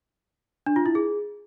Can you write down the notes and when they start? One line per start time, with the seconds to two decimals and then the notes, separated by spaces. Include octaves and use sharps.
0.66 D4
0.76 F4
0.86 E4
0.95 G#4